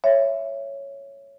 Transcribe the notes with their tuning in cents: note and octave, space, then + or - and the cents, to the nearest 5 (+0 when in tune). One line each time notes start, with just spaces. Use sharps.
C#5 +0 E5 +15